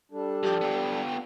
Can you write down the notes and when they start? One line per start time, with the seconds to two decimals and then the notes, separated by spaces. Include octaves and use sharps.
0.11 G3 D4 A4
0.43 G2 F3 G4
0.61 B3 F4 G5